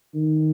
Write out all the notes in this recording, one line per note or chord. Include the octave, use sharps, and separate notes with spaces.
D#3